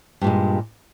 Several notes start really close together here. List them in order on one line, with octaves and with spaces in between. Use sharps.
G2 A#2 G#3